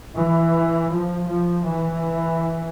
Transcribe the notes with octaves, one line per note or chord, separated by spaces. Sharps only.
E3
F3
F3
E3